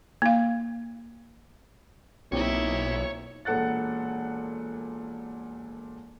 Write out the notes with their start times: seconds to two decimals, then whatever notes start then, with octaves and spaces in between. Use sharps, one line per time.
0.22 A#3 F5
2.32 B1 A#2 C4 D#4 E4 G4 C#5
3.45 E1 A#2 A4 F#5 F#6 A6